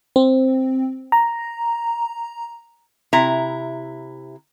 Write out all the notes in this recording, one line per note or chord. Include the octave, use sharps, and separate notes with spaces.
C4
A#5
C3 E4 A#5